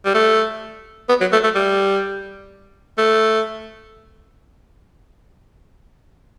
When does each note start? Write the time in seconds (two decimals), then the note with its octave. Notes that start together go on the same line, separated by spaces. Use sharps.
0.05 G3
0.14 A3
1.09 B3
1.21 F#3
1.32 A3
1.44 A3
1.55 G3
2.98 A3